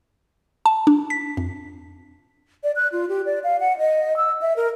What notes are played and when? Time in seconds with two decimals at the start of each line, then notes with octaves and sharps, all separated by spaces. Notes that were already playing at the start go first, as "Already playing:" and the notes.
0.66 A5
0.87 D4
1.10 B6
1.37 F2
2.64 D5
2.76 F#6
2.92 F4
3.09 G4
3.26 D5
3.44 F5
3.60 F#5
3.78 D#5
4.17 E6
4.42 E5
4.56 A#4